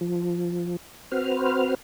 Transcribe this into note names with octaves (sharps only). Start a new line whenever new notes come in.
F3
C4 F#4 B4 C5 F6